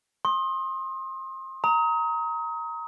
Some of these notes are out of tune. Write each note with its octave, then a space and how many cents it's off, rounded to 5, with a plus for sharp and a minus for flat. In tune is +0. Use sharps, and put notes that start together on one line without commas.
C6 +30 D#6 +0
A#5 +0 D#6 +35